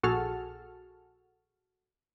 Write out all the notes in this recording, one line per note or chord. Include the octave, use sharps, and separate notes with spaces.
A#1 F#4 G#4 A4 A5 F6